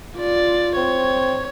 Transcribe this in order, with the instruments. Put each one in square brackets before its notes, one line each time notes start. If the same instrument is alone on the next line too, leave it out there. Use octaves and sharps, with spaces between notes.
[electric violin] F4 D5
[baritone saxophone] C4 [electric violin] C#5